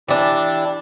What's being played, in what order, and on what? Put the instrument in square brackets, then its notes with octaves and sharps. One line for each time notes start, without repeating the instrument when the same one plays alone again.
[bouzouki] E3 D4 [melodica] E4 G4